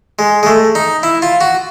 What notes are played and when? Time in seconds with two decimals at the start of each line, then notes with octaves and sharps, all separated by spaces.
0.19 G#3
0.43 G#3
0.46 A3
0.75 D#4
1.03 E4
1.22 F4
1.41 F#4